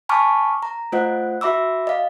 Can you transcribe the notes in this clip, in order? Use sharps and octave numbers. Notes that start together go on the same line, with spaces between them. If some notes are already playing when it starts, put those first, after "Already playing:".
G#5 A5 B5 C#6 D6 F6
A#5
A3 F4 C5 D#5 F#5
F#4 E5 B5 D6 E6
D#5 F5